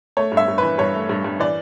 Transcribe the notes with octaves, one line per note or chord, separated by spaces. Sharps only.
A3 C#5
G2
E5
G2
E3 B4
G2 C#5
A3
G2
G2
E3 D5